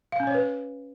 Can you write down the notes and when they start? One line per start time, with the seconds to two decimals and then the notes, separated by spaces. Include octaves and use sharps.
0.12 F5
0.20 C#4
0.27 C#5
0.34 B4